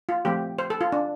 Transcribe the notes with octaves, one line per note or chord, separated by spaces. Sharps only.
F4
F3 A3 C4 G4
C5
A4
F4
D4